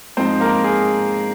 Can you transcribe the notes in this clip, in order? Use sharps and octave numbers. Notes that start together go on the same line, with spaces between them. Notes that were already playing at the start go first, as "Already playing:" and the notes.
G#2 F3 C4 D#4 C5
A#3 A#4
G#4